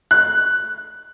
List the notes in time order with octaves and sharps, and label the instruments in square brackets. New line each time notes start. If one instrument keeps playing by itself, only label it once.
[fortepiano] F#6